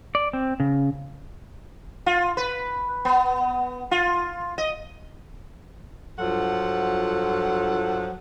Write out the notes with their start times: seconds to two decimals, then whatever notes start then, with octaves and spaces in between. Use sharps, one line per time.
0.15 D5
0.33 C4
0.60 C#3
2.06 F4
2.37 B4
3.05 B3
3.91 F4
4.58 D#5
6.18 G2 F3 F#3 F4 A4 F#5